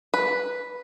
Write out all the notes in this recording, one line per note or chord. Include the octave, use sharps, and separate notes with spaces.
B4